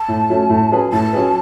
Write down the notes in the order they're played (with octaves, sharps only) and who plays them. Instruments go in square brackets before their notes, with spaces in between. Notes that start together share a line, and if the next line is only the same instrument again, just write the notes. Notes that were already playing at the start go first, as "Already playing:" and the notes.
Already playing: [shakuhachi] A5
[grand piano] A2
F#3 A3 C#4
A2
F#3 C#4 G#4 B4
[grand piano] A2 [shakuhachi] A5
[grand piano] F#3 C#4 G#4 B4